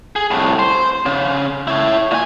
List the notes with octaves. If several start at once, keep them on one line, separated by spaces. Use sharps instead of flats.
G#4
C2 A2
C5
C#3
E4 C#5
A#2 G#5